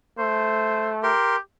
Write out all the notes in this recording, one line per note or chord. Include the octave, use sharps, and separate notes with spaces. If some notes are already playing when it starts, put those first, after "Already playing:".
A3 C5
G4 A#4 C6